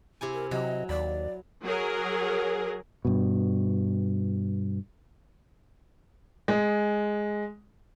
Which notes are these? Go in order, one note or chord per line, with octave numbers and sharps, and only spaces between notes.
C3 E4 G#5
A#4
C3 F#3 D#5
D#2 D5 B5
F#3 G#4 A#4
G2 B2
G#3